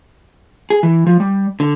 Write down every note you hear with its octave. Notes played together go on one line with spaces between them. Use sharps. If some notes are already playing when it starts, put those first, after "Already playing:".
G#4
E3
F3
G3
D3